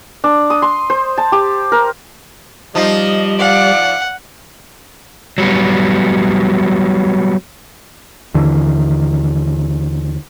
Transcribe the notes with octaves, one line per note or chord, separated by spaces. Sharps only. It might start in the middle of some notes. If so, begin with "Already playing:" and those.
D4
D#6
C6
C5
A5
G4
A#4
F3 G3 D#4 F4 G4 D#5
D5 F5 F#5
F#3 G3 B3
D#2 D3 E3